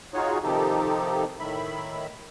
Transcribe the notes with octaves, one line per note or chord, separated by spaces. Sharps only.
D#4 F4 F#4 G#4 C#5
C3 D#3 F3 D#4 G4 A4
A2 D#3 E5 B5